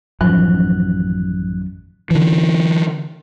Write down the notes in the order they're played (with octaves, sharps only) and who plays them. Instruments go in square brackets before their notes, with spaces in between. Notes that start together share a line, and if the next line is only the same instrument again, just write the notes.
[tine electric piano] A1 F#6 [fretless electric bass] F#2 D#3 B3 [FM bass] F3
[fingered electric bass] D3 E3